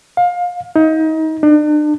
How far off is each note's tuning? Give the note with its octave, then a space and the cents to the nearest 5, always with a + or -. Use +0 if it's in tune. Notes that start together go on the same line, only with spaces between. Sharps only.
F5 +25
D#4 +30
D4 +40